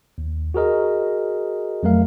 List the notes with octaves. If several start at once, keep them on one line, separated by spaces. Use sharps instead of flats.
D#2
F#4 G#4 A#4 D#5
F2 F#3 A3 A#4 F5